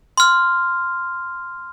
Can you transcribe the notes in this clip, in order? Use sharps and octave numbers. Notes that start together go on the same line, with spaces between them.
C6 F6